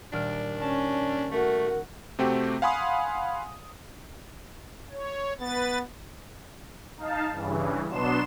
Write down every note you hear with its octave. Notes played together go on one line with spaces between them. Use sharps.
D#1 D4 F6 D7
C#4 A5
A3 F#4 A#4
C3 A3 C4 F#4 G4
F5 F#5 G#5 B5 C6 D#6
C#5
B3 B4 A6
D#4 F5 A5
G2 C#3 E3
B2 F#3 B3 D4 C6 E7